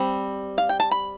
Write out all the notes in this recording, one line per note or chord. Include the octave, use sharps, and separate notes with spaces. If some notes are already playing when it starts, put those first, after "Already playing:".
Already playing: G3 C4
F5
G5
A5
B5